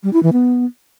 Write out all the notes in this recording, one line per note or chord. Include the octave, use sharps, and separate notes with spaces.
G3
E4
E3
B3